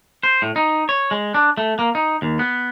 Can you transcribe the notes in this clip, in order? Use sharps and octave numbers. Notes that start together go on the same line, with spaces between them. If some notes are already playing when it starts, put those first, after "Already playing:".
C5
A2
D#4
C#5
G#3
D4
A3
A#3
D#4
D#2
B3